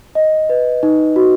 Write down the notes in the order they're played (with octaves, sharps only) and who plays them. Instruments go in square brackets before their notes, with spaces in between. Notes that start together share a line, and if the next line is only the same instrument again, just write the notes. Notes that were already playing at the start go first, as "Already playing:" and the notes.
[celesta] D#5
B4
D#4
F#4